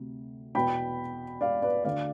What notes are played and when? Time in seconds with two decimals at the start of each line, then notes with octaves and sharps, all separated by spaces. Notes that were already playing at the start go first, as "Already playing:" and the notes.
Already playing: D2 C3
0.55 E2 B2 B3 G5 B5
1.41 D5 F5
1.62 B4 D5
1.84 D2 D3 A3 D5 F5